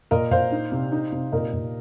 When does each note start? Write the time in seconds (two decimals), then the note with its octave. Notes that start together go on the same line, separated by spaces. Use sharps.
0.11 A#2 A#4 D#5
0.31 A#2 C5 F5
0.52 D#4
0.72 C3
0.92 D#4
1.12 C3
1.32 A#2 A#4 D#5
1.53 A#2